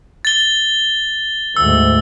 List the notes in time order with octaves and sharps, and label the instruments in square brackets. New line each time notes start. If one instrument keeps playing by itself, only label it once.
[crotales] A6 G7
[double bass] D2 G#2 [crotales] E6